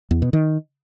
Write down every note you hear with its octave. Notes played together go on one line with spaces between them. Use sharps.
E2
B2
D#3